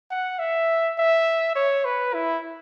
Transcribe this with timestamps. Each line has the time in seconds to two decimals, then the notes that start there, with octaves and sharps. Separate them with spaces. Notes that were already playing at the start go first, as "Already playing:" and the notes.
0.10 F#5
0.39 E5
0.98 E5
1.55 C#5
1.85 B4
2.14 E4